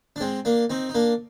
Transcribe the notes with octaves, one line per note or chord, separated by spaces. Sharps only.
D4
G#3 C4
A#3 D4
C4 D#4
D#4
A#3 D4